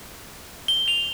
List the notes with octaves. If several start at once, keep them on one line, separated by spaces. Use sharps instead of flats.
G7
F7